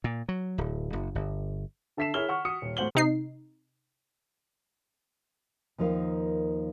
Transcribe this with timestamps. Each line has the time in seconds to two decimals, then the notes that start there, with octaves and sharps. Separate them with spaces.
0.04 A#2
0.29 F#3
0.58 D1
0.93 F#1
1.15 G1
1.97 D3 A4 E5 B6 C7 E7
2.14 E4 G#4 A#4 C#5 F6 G7
2.29 F#5 C#6 F6
2.45 F#4 D#6 C#7
2.62 D#1
2.77 A2 F#4 C5 F#5 F#7 G7
2.95 C3 D#4 C7
5.78 D#2 F3 D#4 A#4 F5